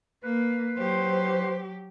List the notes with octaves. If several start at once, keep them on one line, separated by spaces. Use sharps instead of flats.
A#3 B4
F#3 G4 C5